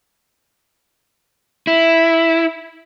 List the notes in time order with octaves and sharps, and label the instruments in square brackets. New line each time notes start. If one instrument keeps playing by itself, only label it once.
[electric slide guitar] E4